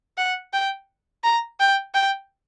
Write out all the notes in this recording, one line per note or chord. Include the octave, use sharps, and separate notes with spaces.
F#5
G5
A#5
G5
G5